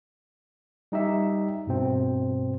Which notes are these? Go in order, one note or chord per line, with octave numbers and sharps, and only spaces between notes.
G3 D#4 G4 E5
G2 B2 C4